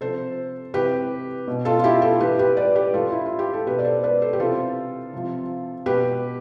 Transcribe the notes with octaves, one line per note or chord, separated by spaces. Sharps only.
C3 F3 A4 C5
C3 E3 G4 B4
B2
F4 A4
F4
E4 G4
F4 A4
A2 E3 G4 B4
G4 B4
B4 D5
G4 B4
A2 E3 F4 A4
E4
F4
G4
A4
B2 G4 B4
D5
A4 C5
B4 D5
A4 C5
G4
C3 E3 F4 A4
C3 F3
B2 G4 B4